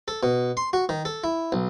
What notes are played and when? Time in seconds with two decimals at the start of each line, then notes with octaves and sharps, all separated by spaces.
0.08 A4
0.23 B2
0.57 C6
0.73 F#4
0.89 D#3
1.05 A4
1.24 E4
1.52 B1